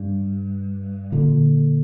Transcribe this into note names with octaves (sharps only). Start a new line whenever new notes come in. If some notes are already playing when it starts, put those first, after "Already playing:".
Already playing: G2
A#2 D3